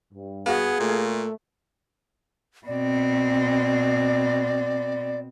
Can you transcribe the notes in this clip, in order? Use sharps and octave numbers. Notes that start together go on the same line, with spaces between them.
G2
B3 F#4 G#4 F5
A#2 A3
B2 C4 D5